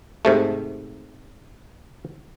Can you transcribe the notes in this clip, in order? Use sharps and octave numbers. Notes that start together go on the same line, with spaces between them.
G#2 C3 A3